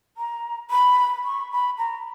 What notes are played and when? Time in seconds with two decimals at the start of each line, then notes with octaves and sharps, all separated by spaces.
0.17 A#5
0.71 B5
1.24 C#6
1.52 B5
1.78 A#5